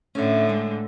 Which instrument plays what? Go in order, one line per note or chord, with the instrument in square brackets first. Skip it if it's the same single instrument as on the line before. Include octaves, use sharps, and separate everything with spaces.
[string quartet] A2 D3 [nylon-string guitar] C#4 E5
[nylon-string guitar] G#3